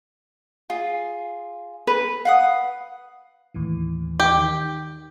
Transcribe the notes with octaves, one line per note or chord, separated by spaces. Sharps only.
F4 G#4
B4
F5 F#5 D#6
D#2 A2 E3
G4
D#3